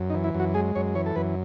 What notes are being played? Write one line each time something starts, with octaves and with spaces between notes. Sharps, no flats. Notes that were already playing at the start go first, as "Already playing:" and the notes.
Already playing: F#2
D#4
E3
E4
F#2
F#4
G#3 G#4
F#2 C#5
E3 C#5
A4
F#2 B4